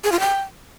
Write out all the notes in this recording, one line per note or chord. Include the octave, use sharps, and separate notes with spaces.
G#4
F4
G5